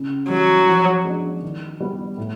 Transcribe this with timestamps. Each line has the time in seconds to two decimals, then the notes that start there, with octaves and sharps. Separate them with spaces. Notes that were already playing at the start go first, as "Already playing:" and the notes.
Already playing: C#3
0.29 E3 F#3 G3
0.68 F3
1.05 G#3 B3 D4
1.42 D#3
1.80 G3 B3
2.17 A2